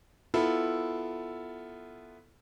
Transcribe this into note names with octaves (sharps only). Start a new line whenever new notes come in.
B3 E4 F4 A4